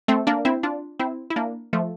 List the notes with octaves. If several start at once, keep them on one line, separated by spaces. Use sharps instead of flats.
A3 C4
A#3 D4
C4 E4
D4 F4
C4 E4
E4
A#3 D4
F3 A3